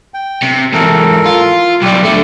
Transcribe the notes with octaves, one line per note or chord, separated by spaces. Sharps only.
G5
C3
G#2 E3 A4 A#4
F4
B1 G3 G4
D3 A3